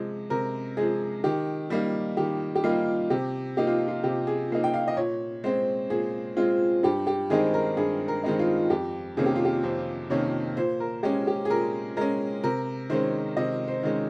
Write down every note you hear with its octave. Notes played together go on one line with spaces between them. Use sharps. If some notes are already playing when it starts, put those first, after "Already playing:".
Already playing: C3 F3 G#3
C3 A#4
F3 G#3 G#4
D#3 G4
G3 A#3 D#4
D#3 G4
G4
G3 A#3 D#4 F4
C3 G4
F3 A#3 D#4 G4
F4
F4
C3 G4
G#4
F3 A#3 D#4
G5
F5
D#5
A#2 C#5
G#3 C4 C5
A#2 G#4
G#3 C4 F4
G2 G4
G4
D#3 G#3 C4 D#4 G#4
A#4
G2 G#4
A#4
D#3 G#3 C4 D#4
F4
F2 G4
C3 D#3 A#3 C#4 G#4
G4
F4
G4
F2 C5
C3 D#3 A#3 C#4 C#5
A#2 C5
A#4
G#3 C#4 G4
G4
G#4
A#2 A#4
G#3 C#4 A#4
C3 A#4
D#3 G#3 C#4 C5
C3 D#5
C5
D#3 G#3 C#4